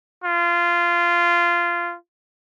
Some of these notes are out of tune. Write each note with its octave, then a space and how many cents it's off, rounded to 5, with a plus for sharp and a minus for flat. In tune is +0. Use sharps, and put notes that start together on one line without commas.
F4 -15